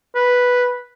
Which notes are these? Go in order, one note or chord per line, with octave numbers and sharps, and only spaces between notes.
B4